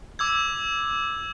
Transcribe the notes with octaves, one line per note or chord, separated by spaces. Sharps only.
D6 E6 G#6